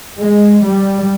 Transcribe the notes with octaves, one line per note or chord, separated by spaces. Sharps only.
G#3
G3